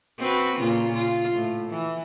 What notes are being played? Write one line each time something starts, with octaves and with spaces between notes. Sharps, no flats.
C4 F#4 B4
A#2 C#3 F4
F4
A2
E3